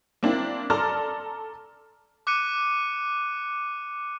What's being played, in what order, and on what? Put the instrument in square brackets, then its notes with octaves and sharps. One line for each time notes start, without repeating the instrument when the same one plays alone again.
[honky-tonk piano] A#3 C4 D4 E4
A4 D5 A5 A#5 C6 F6
[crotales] D6 F#6 C#7 D#7